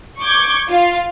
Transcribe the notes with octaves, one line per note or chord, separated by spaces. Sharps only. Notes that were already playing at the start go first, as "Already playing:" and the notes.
C#6 D6 G6 G#6
F4 F5